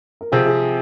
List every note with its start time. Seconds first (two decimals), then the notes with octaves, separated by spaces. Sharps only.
0.21 A#4
0.32 C3 F3 C4 G#4
0.46 G#4